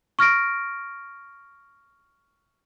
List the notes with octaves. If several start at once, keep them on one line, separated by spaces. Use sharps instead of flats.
C#6 F6 A#6 D7